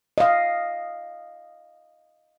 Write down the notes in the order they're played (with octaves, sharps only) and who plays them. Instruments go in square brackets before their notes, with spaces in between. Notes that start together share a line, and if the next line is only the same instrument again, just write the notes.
[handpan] D#5 F5